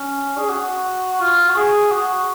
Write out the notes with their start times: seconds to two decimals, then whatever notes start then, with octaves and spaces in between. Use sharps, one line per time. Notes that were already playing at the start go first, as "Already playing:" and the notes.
Already playing: C#4
0.38 G#4
0.49 F#4
1.20 F4
1.49 F#4
1.56 G#4
1.91 F#4